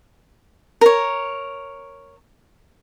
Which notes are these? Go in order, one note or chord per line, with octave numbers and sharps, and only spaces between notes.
A#4 C#5